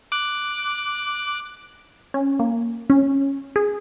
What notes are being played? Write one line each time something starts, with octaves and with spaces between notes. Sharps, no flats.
D6 F#6
C#4
A#3
C#4
G#4